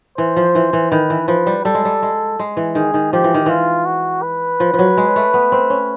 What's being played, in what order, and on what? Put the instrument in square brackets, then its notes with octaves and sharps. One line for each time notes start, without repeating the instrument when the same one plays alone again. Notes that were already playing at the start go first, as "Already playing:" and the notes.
[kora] E3 [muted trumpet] C5
[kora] F3
E3
E3
[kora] D#3 [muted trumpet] B4
[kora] E3
[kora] F3 [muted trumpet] B4
[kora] G3
[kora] G3 [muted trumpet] A4
[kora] G#3
G3
G#3
G#3
E3
[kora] D#3 [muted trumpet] G#4
[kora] D#3
[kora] F3 [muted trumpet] G4
[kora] E3
D#3
[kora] E3 [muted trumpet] F4
[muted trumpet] F#4
B4
[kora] F3
F3
F#3
G#3
A3
B3
C4
C#4